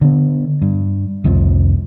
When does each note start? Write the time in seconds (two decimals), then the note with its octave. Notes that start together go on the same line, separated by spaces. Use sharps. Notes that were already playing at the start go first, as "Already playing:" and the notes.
0.01 D3 B3
0.62 G2
1.24 C2 F2 C3 F3